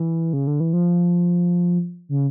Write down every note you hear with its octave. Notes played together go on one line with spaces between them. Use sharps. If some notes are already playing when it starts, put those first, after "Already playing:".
Already playing: E3
C#3
D3
E3
F3
C#3